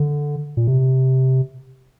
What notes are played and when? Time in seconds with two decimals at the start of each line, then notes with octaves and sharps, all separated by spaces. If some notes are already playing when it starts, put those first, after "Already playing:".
Already playing: D3
0.57 A#2
0.67 C3